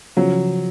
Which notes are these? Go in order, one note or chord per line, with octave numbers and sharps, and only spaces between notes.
C#3 F3 F#3